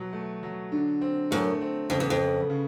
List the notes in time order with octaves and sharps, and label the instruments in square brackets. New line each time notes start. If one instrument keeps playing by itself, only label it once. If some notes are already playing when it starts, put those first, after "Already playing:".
Already playing: [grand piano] B2 F#3
A3
F#3
D3
C4
[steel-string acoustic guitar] F#2 [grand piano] A3
[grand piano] C4
[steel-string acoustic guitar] F2 [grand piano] C#3
[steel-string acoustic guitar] E2
F2
[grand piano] B3
C#3